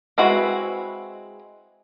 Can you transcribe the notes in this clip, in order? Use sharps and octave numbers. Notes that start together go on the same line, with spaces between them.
G#3 C4 E4 F#4 B4